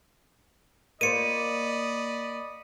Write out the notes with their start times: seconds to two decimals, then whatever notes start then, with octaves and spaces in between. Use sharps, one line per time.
1.01 A#3 F4 C5 D5 D#5 B5 C#7 D#7